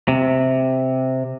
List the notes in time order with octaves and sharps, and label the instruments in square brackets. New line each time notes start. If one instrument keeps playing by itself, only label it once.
[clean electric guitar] C3